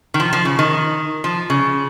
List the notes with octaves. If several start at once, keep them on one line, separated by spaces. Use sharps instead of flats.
D#3
F3
F3
C#3
D#3
F3
C#3